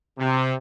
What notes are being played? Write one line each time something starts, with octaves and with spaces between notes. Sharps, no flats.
C3